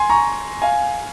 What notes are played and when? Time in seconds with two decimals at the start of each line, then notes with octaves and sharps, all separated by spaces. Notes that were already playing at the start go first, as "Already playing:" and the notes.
Already playing: G#5 C6
0.10 A#5 C#6
0.62 F5 G#5